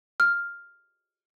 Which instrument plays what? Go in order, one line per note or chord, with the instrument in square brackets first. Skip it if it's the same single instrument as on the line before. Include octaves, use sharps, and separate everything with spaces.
[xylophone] F6